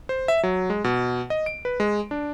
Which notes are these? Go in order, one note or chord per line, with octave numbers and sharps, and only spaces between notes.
C5
E5
F#3
G#3
B2
D#5
D7
B4
G#3
D4